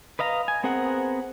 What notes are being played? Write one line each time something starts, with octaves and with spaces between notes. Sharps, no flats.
B4 D#5 F5 A#5
G#5
B3 C4 G#4 A#4 F#5